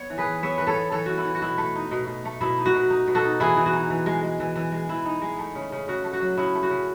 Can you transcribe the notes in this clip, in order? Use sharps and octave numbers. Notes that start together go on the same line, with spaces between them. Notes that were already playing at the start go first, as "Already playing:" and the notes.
Already playing: B3 C#5
E3
G#4 B4
E3
B3 C#5 E5
E3 B4
A4 C#5
B3
E3 A4 C#5
E3 F#4
E4
E3
F#4
B2 E4
A3
D#4
B2
B2
A3
B2 E4
D#4
F#4
B2
D#4
B2
F#4 A4
D#4
E3 E4 G#4
E3
F#4
D#4
E3
G#3
G#3
E3
E3
G#3
E3 E4
D#4
G#3
A3
C#3
C#3
C#3 F#4
A3
F#4
F#3
C#3 E4
A3
F#4
C#3